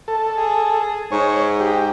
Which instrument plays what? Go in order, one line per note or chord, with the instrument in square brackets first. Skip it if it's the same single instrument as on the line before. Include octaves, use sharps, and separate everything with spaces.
[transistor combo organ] A4
[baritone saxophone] G#4
[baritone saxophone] G#2 [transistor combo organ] C#5
[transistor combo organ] G4